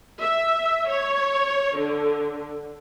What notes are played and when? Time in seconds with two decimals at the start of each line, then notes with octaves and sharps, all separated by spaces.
0.22 E5
0.89 C#5
1.77 D3